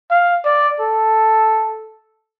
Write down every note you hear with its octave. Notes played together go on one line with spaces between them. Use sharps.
F5
D5
A4